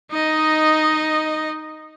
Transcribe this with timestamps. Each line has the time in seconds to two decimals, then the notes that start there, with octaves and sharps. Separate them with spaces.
0.12 D#4 D#5